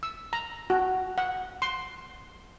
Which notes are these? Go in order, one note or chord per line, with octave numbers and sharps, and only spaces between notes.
E6
A#5
F#4
F#5
C6